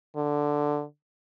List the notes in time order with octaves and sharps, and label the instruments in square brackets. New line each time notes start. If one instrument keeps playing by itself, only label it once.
[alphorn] D3